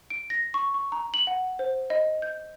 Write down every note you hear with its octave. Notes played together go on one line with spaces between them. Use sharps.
D7
A#6
C#6
C#6
A#5
F#7
F#5
C5
D#5
G6